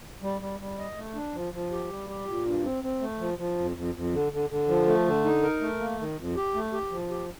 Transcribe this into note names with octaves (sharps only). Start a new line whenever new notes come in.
G3
G3
G3
D#5
A3
D4
F3
F3
G4
G3
G4
A#2
G2
C4
C4
A3
F3
F3
F2
F2
F2
D3
D3
D3
F3
A3
D3
D#4
A#4
A3
A#3
D#3
F2
G4
A3
G4
F3
G4